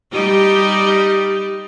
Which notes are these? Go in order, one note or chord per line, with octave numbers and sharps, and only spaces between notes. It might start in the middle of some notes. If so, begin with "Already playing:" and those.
G3 D#4 G4